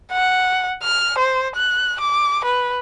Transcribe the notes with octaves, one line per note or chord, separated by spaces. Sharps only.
F#5
F6
C5
F#6
D6
B4